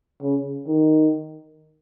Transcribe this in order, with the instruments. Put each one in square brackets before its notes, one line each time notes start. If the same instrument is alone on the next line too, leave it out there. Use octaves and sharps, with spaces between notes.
[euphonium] C#3
D#3